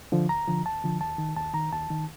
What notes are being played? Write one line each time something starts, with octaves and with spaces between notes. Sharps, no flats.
D3 F3
D2 A#5
D3 F3
D2 A5
D3 F3
D#2 A5
D#3
D#2 A5
D#3 A#5
D#2 A5
D#3